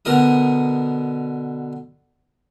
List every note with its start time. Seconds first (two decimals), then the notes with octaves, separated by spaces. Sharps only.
0.05 B2 D3 A#4 D#6